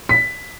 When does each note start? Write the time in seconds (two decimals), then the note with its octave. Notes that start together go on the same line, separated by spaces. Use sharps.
0.09 B6